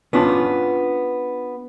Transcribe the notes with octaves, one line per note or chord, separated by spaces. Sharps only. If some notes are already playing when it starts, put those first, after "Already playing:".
B3 C#4 D4 F4